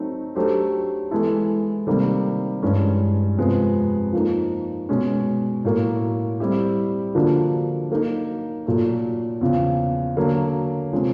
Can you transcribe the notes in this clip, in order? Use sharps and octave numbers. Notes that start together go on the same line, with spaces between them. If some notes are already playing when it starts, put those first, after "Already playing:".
Already playing: F#3 A3 C4 D#4
F#3 A3 D4 G4 C5
E3 G#3 B3 E4 A4
C3 D#3 G3 A#3
G2 E3 G#3 C#4
F2 C3 F3 G#3 B3
F3 A#3 D#4
B2 G#3 C#4
A2 F#3 A#3
G3 C4 E4 G4
D3 F3 A#3 D4 F#4
F#3 A#3 D#4
A#2 F#3 A3
E2 C#3 F3
D3 F#3 A#3
C3 F3 G#3 C#4